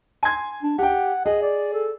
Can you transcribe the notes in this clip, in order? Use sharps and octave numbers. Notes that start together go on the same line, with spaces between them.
G#5 C6 G#6
D4
G4 F#5 G5
G#4 D#5
D5
A4